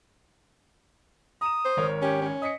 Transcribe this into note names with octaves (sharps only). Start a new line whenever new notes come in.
A#5 D#6 E7
C5
G#1 A#4 C#5
C#4 G4
C#4
D#5 D#6 B6 C#7